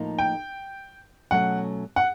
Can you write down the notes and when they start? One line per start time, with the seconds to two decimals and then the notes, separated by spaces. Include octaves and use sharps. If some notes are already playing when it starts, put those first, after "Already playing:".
Already playing: A2 F3 A#3 D#4
0.19 G5
1.31 B2 F#3 A3 C#4 F#5
1.96 F#5